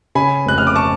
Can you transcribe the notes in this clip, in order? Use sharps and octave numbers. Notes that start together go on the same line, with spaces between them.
C#3 G#5 B5
F1 F#6
F6
D6
A5 C#6